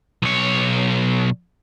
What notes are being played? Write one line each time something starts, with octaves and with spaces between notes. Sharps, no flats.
B1 C#5